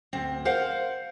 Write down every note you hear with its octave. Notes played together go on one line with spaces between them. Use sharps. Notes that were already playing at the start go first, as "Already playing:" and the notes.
D2 C4
A#4 C5 F5 F#5